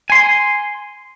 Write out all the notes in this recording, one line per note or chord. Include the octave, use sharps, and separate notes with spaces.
G#5 C6